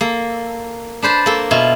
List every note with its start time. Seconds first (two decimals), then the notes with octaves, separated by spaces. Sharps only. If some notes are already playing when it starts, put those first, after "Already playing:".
0.01 A#3 A4
1.02 D4 B4 C5 A5
1.26 A#3 A4
1.51 B2 E4 F4